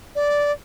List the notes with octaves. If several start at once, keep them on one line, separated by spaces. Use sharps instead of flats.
D5